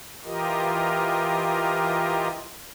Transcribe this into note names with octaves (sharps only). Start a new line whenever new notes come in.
E3 F4 G4 A#4 D#5